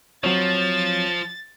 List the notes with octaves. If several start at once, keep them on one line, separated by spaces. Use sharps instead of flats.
F3 F#3 C4 C#5 A6